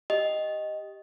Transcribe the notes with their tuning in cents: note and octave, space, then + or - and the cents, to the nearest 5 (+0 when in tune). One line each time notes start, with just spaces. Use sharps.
G4 +0 D#5 +0